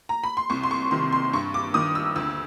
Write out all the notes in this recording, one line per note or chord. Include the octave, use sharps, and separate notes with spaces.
A#5
B5
C6
C2 C#6
C6
C#6
C3 D#3 C6
C6
G2 C#6
D6
D#3 D#6
E6
D2 E6